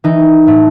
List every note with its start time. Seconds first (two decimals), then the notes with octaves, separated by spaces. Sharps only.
0.04 E3 D#4
0.47 A2 A3